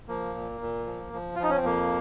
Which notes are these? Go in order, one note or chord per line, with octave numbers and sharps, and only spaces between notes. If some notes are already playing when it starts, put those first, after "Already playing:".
F3 A#3
A#2
A#2
F3
F3
F4
F3 D#4
C#4
C4
F2 A#3